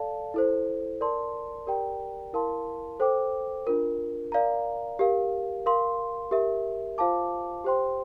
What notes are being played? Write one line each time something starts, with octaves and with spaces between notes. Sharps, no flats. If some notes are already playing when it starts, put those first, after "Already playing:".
Already playing: A4 D5 F5 A5
E4 A4 C5
A#4 D5 A5 C6
G4 A#4 D5 G5 A#5
E4 A#4 F5 A5 C6
A4 C5 G5 D6
D4 F4 A#4
A#4 D5 F5 A#5
G4 A#4 F5
A#4 F5 C6
G4 A#4 E5
F4 C5 F5 A5 D6
G4 C5 G5 C6